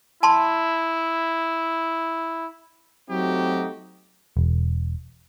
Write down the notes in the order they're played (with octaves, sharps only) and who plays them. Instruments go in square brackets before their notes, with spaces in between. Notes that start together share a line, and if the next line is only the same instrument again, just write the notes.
[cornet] E4 [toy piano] A5 C6
[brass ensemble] F#3 A3 C4 D#4 F#4 G4
[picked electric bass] E1